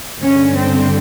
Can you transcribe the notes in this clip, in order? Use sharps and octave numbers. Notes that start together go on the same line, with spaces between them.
G2 D3 C#4
C4